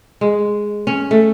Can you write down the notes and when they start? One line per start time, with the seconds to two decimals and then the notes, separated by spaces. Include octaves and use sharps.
0.21 G#3
0.87 C#4
1.11 A3